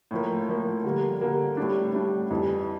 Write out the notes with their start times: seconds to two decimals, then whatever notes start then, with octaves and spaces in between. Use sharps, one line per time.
0.11 A2 F3 A#3
0.48 A2 F3 A#3
0.84 D3 G3 A#3
1.21 D3 G3 A#3
1.57 A2 G3 D4
1.94 A2 G3 D4
2.30 F2 E3 G3